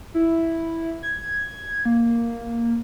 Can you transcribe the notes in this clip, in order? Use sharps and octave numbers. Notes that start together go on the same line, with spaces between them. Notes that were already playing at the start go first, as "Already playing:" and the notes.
E4
G#6
A#3